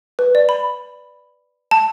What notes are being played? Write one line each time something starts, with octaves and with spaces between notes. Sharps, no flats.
B4
D5
B5
A5